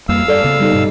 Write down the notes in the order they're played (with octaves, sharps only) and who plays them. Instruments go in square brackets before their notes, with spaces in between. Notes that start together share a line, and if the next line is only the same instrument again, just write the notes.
[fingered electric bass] F2 G3 A#3 [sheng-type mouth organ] F5 E6
[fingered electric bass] G2 [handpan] A4 D5
[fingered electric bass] C#3 B3
[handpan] G3 D#4 A4
[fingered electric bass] G2 B2